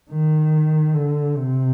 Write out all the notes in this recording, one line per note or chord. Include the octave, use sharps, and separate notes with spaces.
D#3
D3
C3